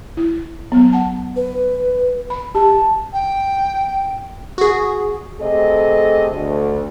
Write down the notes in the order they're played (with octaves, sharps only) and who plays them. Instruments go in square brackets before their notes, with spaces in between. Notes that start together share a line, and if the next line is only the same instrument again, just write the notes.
[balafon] E4
F#3 B3
F#5 A5
[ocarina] B4
[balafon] B5
[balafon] G4 [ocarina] A5
[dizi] G5
[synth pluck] F#4 G#4
[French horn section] C3 A3 G#4 A4 D#5
D2